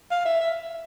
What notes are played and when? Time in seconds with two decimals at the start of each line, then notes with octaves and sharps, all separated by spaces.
0.11 F5
0.25 E5
0.40 E5